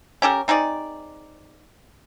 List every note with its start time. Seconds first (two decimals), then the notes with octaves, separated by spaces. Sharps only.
0.22 C#4 G4 A4 A#4
0.48 C4 D#4 G#4 D5